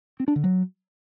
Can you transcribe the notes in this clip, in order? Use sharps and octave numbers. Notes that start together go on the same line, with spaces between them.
C4
D4
D3
F#3